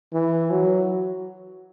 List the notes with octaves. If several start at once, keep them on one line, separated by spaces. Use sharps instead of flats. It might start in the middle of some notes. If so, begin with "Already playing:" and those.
E3
F#3